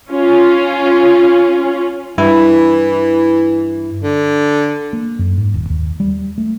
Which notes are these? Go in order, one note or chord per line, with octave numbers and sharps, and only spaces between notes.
C#4 F4
G2 E3 E4
D3
A#3
F#2
G#2
D#1
D#2
G3
A3